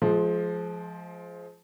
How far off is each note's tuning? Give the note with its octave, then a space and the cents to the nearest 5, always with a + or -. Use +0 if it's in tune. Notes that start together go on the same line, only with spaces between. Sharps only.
F3 +0 G#3 +30 C5 +0